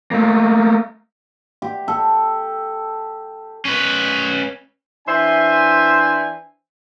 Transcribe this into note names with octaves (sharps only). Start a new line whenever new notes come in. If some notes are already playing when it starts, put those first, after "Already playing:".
A3 A#3
G4
A4
C#4 B4
E3 D4 C5 E5 G#5